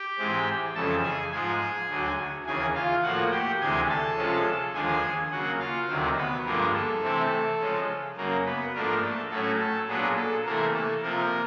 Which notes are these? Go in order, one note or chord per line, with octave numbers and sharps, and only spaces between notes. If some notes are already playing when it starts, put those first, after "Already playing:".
Already playing: G4 G5
G#2 E3 G#3 C4
F2 C#3 E3 A4 A5
G#4 G#5
G#2 F3 G#3 G#4 G#5
D2 D3 F#3
D#2 C#3 E3 G#4 G#5
F4 F5
A2 F3 A#3 F#4 F#5
G4 G5
D2 C3 E3 G#3 G#4 G#5
A4 A5
C3 F3 G#3 C#4
D#2 D3 F3 G#3 G#4 G#5
C#3 F#3 A#3 F#4 F#5
F4 F5
D2 C3 D#3 F#3 C4 C5
B3 B4
G2 D3 F3 G#3 A#3 A#4
A4
C3 E3 A3 C4
C#3 F3 G#3 C#4
F#2 C#3 F#3 A#3 A#4
B3 B4
G#2 F3 A3 A#3 D4 A#4
A4
A2 F#3 A3 C#4 A4
A4
A#2 F#3 B3 D4 G#4
A4
C3 E3 A3 A#3 A#4
A4
C3 F3 A#3 A#4